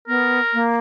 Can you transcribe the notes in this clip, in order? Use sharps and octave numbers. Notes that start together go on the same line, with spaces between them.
B3 A#4
A#3